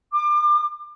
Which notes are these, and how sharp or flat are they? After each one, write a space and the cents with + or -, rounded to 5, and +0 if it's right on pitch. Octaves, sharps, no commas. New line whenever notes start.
D6 +30